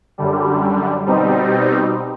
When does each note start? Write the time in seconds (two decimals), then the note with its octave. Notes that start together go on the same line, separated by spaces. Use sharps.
0.18 F#2 D3 G3
1.06 B2 G3 C4 D#4